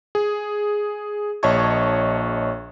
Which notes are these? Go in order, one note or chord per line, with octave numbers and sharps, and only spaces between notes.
G#4
A#1 C#5 D#5 A5 C#6 G#6